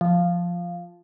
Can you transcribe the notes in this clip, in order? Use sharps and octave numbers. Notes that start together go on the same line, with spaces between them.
F3